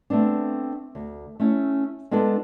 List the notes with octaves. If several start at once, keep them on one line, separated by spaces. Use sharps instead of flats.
A3 B3 C4 D4
D2
A3 C#4 E4
G#3 B3 D4 F4 A4